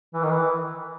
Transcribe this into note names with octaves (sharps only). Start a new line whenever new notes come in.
E3
D#3
E3